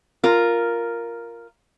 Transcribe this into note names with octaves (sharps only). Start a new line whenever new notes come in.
F4 A#4